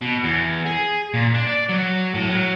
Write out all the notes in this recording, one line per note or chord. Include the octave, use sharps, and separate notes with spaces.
B2
E2
G#4
A#2
D4
D5
F#3
A2
F#3